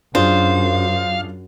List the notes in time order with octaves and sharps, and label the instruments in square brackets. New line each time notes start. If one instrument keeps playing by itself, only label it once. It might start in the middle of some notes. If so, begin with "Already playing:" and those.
[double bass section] F#2 [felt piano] D4 F4 G#4 [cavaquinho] C5 [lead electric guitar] F5